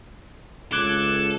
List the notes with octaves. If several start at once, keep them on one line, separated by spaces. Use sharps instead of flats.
C#2 A4 D6 F#6 G#6